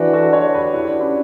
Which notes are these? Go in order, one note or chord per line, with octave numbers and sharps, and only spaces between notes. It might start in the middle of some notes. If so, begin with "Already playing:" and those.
Already playing: E3 D4 F#4
F#4 A4
A4 C#5
G4 B4
E4 G4
D4 F#4
C#4 E4